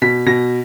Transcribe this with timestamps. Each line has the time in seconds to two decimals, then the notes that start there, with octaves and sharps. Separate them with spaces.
0.02 B2 B6
0.26 B2 A#6